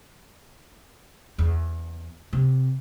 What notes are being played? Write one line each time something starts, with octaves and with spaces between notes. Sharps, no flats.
E2
C3